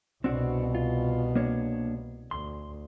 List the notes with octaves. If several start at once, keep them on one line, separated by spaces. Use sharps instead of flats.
C2 B2 C4 D4 F#4
F4
A#3 D4 C#5
D2 C6